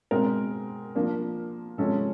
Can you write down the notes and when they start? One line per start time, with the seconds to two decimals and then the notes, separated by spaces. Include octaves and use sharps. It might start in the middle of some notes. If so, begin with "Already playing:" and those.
0.11 B2 G#3 C4 A#4
0.95 F3 A#3 D4
1.78 C3 F3 G#3 C#4 A4